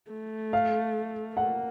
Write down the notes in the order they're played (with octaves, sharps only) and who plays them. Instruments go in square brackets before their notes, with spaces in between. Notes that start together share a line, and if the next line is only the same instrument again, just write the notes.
[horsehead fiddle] A3
[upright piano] F5
[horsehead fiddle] A#3 [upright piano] F#5